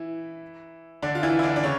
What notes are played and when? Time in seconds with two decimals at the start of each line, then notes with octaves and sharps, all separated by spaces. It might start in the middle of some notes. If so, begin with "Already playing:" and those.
Already playing: E3 E4
1.02 D3 D4
1.15 F4
1.23 E3 E4
1.39 E4
1.43 D3 D4
1.56 D4
1.63 C#3 C#4